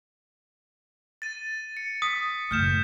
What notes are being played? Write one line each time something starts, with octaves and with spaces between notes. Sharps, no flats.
A6 D#7
C#7
D#6 B6
F#1 A2 F6 G6 E7